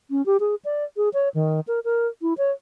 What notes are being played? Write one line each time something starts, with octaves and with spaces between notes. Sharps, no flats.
C#4
G4
G#4
D5
G#4
C#5
D#3
A#4
A#4
E4
C#5